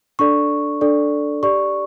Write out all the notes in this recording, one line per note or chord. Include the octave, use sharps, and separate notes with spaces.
D4 A4 D5 C#6
D4 A4 D5
G4 D5 C#6